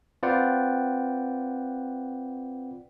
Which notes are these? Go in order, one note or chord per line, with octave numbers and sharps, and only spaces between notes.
C4 F4 B4 D5 F#5 G5